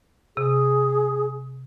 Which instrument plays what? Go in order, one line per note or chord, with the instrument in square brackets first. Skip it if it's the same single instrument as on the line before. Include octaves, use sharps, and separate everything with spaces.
[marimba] C3 [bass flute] G#4